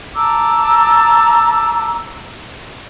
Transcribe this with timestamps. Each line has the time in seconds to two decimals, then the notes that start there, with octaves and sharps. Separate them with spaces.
0.16 A5 A#5 D6 E6